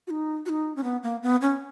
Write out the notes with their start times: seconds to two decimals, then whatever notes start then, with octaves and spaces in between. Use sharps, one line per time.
0.07 F#4
0.11 D#4
0.46 F#4
0.49 D#4
0.76 C#4
0.84 B3
1.03 A#3
1.23 B3
1.42 C#4